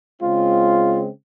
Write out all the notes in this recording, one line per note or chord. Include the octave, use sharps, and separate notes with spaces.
C#3 G#3 C4 F4